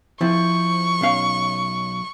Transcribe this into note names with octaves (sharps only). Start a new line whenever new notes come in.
F3 C4 E4 C#6
B1 C#4 F5